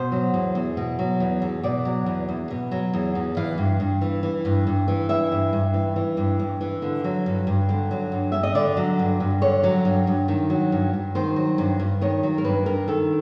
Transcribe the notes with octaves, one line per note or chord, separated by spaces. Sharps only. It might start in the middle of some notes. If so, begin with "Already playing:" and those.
Already playing: B2 C5
F#3
E2
E2
B2
F#3
E2
E2
B2 D5
F#3
E2
E2
B2
F#3
E2
E2
E3 F5
G2
G2
E3
E3
G2
G2
E3
E3 E5
G2
G2
E3
E3
G2
G2
E3
D3
F#3
G2
G2
D3
F#3
G2
G2 E5
D#5
D3 D5
F#3
G2
G2
D3 C#5
F#3
G2
G2
D#3
F#3
G2
G2
D#3 C5
F#3
G2
G2
D#3 C#5
F#3
A#4
G2 B4
G2 A#4
D#3 A4